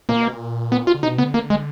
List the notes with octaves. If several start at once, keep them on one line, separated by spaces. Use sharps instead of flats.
A#2 A#3
B2
A#2
B3
F4
D3
B2 D#4
D3 B3
A#3
G#3